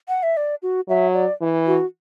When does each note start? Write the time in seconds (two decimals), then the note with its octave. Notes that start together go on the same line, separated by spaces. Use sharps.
0.08 F#5
0.23 E5
0.37 D5
0.62 F#4
0.89 F#3 E5
1.14 D5
1.41 E3
1.67 F#4